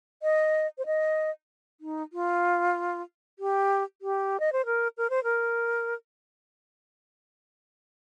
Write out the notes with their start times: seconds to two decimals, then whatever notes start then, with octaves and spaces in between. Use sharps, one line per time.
0.23 D#5
0.78 C5
0.86 D#5
1.81 D#4
2.13 F4
3.39 G4
4.02 G4
4.40 D#5
4.52 C5
4.66 A#4
4.97 A#4
5.10 C5
5.24 A#4